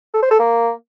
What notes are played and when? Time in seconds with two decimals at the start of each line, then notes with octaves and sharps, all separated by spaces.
0.14 A4
0.23 C5
0.31 A4
0.40 A#3